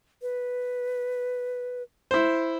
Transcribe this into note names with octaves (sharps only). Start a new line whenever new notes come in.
B4
E4 C5